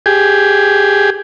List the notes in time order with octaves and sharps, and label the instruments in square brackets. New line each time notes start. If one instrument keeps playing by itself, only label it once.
[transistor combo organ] G4 G#4